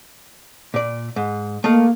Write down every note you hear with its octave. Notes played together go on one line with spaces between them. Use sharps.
A#2 D5
G#2
A3 A#3 D#5 F5